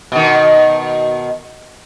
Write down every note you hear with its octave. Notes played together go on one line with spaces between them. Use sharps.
B2 D#3